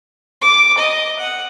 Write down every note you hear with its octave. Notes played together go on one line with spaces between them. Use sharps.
D6
D#5
F#5